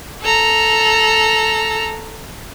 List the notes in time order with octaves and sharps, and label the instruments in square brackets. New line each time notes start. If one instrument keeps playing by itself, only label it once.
[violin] A4 A#5